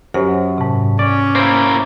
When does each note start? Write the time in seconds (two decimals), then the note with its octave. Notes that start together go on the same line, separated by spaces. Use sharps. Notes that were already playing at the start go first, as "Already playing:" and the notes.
0.14 F#2 G4 C5
0.58 G#2 C3
0.99 C#4 D5
1.35 A#3 E4 C5